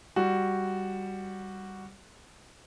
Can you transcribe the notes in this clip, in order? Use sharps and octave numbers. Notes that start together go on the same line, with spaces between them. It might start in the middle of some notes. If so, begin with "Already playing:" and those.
G3 F#4